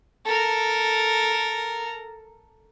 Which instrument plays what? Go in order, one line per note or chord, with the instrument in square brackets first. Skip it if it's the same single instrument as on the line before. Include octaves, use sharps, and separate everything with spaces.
[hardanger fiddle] A4 A#4